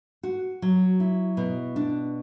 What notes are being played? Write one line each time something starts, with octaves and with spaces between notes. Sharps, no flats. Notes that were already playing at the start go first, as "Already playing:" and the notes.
F#4
F#3
E4
B2
D4